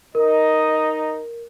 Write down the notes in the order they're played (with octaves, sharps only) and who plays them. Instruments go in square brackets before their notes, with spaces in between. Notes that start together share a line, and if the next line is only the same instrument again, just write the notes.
[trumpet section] D#4 [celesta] A#4 [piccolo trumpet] D#5